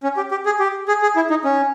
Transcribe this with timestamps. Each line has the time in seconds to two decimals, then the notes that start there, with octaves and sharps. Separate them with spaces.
0.03 C#4
0.17 G4
0.31 G4
0.46 G#4
0.60 G4
0.88 G#4
1.02 G#4
1.16 E4
1.30 D#4
1.44 C#4